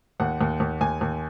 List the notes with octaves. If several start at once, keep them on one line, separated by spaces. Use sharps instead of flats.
D#2 F#5
D#2
D#2
D#2 G#5
D#2